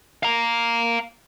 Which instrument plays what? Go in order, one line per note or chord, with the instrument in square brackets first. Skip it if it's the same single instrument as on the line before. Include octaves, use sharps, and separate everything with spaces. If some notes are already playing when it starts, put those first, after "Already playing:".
[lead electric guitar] F5 A#5